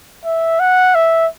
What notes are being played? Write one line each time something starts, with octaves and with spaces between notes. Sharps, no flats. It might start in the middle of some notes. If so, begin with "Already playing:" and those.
E5
F#5
E5